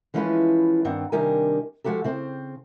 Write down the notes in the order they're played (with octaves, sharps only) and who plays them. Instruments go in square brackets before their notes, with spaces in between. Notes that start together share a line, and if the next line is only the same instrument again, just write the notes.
[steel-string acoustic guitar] E3 F3 G#3 C#4 F4 B4
G2 D#3 C4 D4 F#5
C3 D#3 G3 D4 A#4 G#5
F3 G#3 F#4 G4 A4
C#3 C4 C5